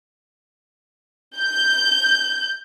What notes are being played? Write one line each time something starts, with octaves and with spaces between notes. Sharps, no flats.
G6